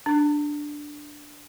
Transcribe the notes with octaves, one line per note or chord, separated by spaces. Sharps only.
D4